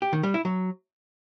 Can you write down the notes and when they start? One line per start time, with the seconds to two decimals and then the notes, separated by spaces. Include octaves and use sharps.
0.02 G4
0.13 D#3
0.23 G3
0.34 E4
0.45 F#3